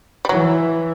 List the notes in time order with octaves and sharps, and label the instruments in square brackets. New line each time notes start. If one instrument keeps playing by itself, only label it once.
[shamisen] G3
[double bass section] E3 [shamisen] F#3